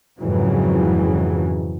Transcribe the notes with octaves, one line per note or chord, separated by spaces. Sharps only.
F2 G#2 C#3 E3 F#3